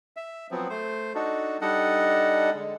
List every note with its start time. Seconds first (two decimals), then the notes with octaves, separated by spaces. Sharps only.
0.17 E5
0.51 F3 F#3 B3 C4
0.70 A3 C5
1.15 D4 D#4 F#4 A4
1.61 G3 D4 D#4 A4 D#5 F#5
2.54 D3 G#3